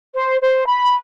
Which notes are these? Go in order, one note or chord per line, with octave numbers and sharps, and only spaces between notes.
C5
C5
B5